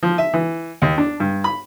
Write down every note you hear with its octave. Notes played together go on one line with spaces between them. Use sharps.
F3
E5
E3
D#2
D4
G2
B5